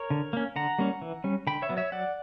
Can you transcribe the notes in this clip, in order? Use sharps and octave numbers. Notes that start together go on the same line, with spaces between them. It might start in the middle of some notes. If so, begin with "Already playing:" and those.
Already playing: A#4 C#5
D3
A#3 C#4
D3 F#5 A#5
G3 A#3 C#4
E3
G3 C#4
D3 G5 B5
C#5 E5
F#3 B3
C#5 E5
F#3 D5 F#5